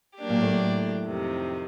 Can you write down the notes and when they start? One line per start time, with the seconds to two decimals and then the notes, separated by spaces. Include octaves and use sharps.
0.18 F#3 A#3 D4 G4
0.29 A#2
0.41 A2
0.52 A2
1.05 F2 C3 D#3